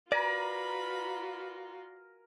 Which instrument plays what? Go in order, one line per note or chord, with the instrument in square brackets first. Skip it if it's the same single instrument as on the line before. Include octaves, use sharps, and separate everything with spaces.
[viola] F4 F#4 [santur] A#4 G#5 A#5 [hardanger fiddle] B4 B5 [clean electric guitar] D5